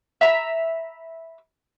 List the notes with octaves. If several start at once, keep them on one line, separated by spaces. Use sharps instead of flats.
E5 A#5 B5